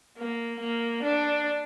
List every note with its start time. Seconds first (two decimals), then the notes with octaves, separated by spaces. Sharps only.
0.18 A#3
0.61 A#3
1.04 D4